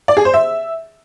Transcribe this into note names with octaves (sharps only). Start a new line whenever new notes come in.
D5
G#4
C5
E5